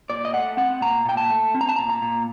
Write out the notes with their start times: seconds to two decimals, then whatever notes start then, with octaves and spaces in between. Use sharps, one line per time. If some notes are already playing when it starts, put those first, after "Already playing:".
0.10 A#2 D5
0.25 D#5
0.34 A3 F#5
0.57 C4 F#5
0.81 A#2 A#5
1.05 A#2 G5
1.17 A5
1.30 A3
1.54 C4
1.61 A#5
1.69 A5
1.76 A#2 A#5
1.89 A#5
2.02 A#2